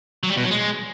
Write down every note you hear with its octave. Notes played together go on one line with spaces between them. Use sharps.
F#3
G3
B2
F#3
G#3